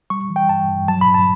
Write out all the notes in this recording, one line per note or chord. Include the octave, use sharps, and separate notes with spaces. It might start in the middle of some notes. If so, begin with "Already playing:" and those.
G3 C#6
E3
G5
G2 A5
G2
F#3 A5
B5
G2
A5